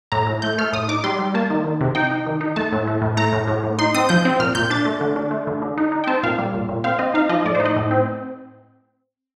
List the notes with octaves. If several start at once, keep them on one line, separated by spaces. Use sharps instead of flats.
A2 A#5
A2
A3 G6
A3 F6
A2 D#6
D#4 D6
G3 C6
G3
A#3 A5
D#3
D#3
C3
D#4 G5
D#4
D#3
D#4
A3 A5
A2
A3
A2
A3 A#5
A2
A2
A2
D#4 C6
C4 D#6
F3 G6
C4
A#2 F6
A#2 G6
D4 A6
A3
D3
D4
A3
D3
D3
D#4
D#4
G5
C4 A5
A#2 F5
G3
A#2
A#2
C4 F5
C4 D#5
D#4 F5
F3 D#5
A2 D5
C5
D#4
D#5
A2
C4